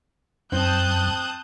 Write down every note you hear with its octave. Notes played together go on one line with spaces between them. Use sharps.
F#2 C4 A5 D#6 F#6 G6